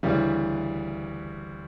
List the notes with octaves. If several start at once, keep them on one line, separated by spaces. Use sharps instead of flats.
D2 C#3 E3 G3